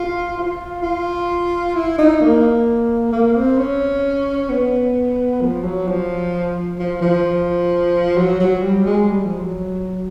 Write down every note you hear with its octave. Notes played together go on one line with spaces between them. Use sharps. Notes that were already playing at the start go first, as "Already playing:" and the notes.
Already playing: F4
F4
F4
E4
D#4
A#3
A#3
C4
C#4
B3
F3
F#3
F3
F3
F3
F#3
F#3
G3
G#3
G3
F3
F#3